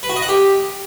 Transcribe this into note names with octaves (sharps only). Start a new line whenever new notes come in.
B4
F#4
D#5
F#5
G4